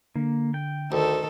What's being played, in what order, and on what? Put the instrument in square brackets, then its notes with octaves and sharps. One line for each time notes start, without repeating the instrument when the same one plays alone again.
[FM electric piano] D3 [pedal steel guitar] A#3
[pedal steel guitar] G5
[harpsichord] D2 [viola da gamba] D#3 A4